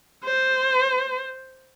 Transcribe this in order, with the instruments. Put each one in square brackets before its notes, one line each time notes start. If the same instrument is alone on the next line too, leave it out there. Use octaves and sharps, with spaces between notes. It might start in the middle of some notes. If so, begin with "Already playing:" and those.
[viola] C5